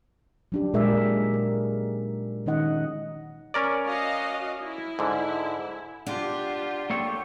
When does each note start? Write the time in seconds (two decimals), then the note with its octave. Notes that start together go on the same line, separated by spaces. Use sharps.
0.52 F#3 D4 G4
0.73 A#2 G#3 G#4 A#4 D5 E5
1.34 A#4
2.46 D#3 C#4 D#4 D#5 F#5
3.54 C#4 A#4 D5
3.87 F#4 D#5 F5
4.63 E4
4.99 G#2 D3
6.06 D4 F4 G4 F#5
6.90 A#3 A4 C#5 G5